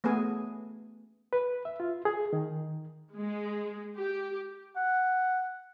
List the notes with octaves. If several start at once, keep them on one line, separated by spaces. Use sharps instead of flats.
A3 B3 C#4 G#4 G#5
B4
E5
F4
G#4
D#3
G#3
G4
F#5